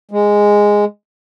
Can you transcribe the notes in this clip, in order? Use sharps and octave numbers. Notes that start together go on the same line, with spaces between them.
G#3